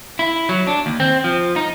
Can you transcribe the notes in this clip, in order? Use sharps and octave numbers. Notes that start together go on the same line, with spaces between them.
E4
F#3
D4
D#2
C4
F3
D#4